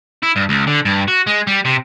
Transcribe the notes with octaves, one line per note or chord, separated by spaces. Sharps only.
E4
G2
C#2
D3
G2
F#4
G#3
G3
C3